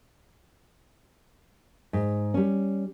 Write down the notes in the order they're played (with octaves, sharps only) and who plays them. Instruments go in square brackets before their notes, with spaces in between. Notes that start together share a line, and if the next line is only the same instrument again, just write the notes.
[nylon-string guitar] G#2
G3 C#4